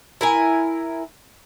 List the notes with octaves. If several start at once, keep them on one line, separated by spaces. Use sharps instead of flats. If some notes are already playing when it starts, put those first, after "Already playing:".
E4 A#4 G#5